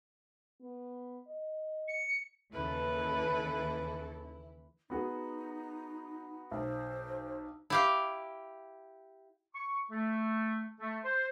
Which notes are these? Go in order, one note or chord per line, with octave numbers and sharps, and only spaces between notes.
B3
D#5
C#7
D#2 C#3 E3 E4 A4 B4
B3 D#4 F#4 G#4
B1 C5
E4 G4 F5
C#6
A3
A3
C5